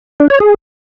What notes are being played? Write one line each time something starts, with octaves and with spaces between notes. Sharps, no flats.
D4
C#5
G#4